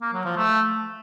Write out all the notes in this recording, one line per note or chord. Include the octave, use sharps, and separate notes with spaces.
A#3
F#3
F3
A3